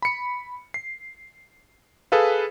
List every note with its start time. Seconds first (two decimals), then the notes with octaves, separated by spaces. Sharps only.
0.02 B5 C#7
0.74 C7
2.12 G#4 A4 B4 F5